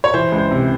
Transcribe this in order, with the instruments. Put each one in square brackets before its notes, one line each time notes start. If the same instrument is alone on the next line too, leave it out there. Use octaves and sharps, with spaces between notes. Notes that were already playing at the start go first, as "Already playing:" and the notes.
[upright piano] C#5
E3 C5
C#2
C5
C3